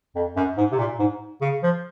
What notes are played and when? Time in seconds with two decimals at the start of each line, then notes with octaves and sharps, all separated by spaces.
0.16 F2
0.36 F#2
0.57 G#2
0.71 C3
0.78 A#2
0.99 G#2
1.41 C#3
1.63 F3